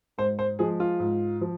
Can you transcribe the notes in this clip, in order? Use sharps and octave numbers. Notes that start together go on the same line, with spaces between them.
G#2 C5
C5
F3 G#3 G#4
F4
G#2
F3